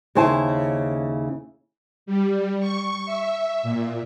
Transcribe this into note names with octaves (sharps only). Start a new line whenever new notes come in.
D#2 C#3 E4 C5 G#5 A5
G3
C#6
E5
A#2